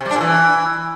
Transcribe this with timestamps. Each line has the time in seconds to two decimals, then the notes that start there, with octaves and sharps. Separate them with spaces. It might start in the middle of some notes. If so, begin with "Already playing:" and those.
0.01 C3
0.06 G3
0.11 D4
0.16 A#2
0.21 E3